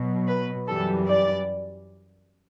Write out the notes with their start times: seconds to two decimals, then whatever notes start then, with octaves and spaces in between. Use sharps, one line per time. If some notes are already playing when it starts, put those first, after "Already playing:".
Already playing: B2 F#3
0.27 B4
0.68 F#2 E3 G3 A4
1.07 D5